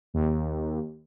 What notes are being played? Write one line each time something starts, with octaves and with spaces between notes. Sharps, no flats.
D#2